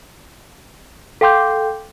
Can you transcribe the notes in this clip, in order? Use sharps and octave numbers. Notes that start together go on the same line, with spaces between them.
A4 F5 G5 C6 D6 G6